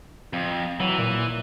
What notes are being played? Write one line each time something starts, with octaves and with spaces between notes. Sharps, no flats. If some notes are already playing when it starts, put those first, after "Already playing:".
F2
E3 F#3
A#2